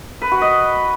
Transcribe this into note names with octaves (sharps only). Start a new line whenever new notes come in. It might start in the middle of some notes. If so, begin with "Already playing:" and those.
B4
F#4
D#5